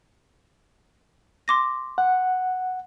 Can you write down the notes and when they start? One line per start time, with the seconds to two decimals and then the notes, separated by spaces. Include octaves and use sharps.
1.48 C6 D6 A#6
1.98 F#5